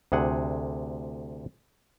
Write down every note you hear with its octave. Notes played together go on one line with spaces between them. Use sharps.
D2 C3 G#4 F#5